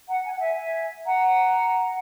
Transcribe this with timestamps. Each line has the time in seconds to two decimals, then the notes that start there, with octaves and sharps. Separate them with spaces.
0.08 F#5 A#5
0.25 G#5
0.31 F#5
0.38 E5 G#5
1.05 F#5 A#5